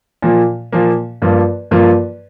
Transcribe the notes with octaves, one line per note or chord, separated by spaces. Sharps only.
A#2 F3 A#3
A#2 F3 A#3
G2 F3 A#3 F4
G2 F3 A#3 F4